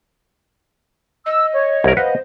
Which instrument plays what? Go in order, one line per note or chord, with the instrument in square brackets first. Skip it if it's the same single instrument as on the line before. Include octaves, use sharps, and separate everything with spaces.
[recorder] D#5 [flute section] E6
[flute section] C#5
[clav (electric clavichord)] C2 A#4
[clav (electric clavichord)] B4 F5 F#5 [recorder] C5 [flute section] D#5